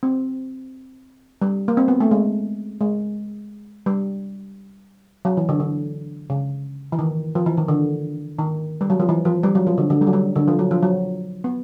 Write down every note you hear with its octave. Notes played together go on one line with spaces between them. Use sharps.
C4
G3
A#3
C4
B3
A3
G#3
G#3
G3
F#3
E3
D3
D3
C#3
E3
D#3
F3
E3
D#3
D3
D#3
G3
F#3
F3
E3
F3
G3
F#3
F3
D3
D3
G3
F#3
G3
D3
F3
F#3
F3
F#3
B3